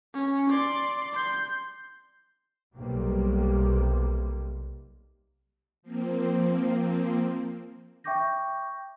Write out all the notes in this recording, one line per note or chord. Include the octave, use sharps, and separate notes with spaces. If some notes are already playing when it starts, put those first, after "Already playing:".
C#4
D5 C6
C6 G6
B1 C3 G3 A#3
F3 A#3 C4
E5 G5 C#6 D6 G6 A#6